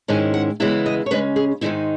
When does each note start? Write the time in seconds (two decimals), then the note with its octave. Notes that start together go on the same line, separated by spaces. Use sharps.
0.08 G#2 D#3 G#3 C#4 E4 G#5
0.34 F#5
0.60 C#3 E3 G#3 B3 E4 E5
0.86 D#5
1.06 C#5
1.11 C#3 G#3 C#4 B4
1.36 G#4
1.61 G#2 D#3 G#3 D#4 E4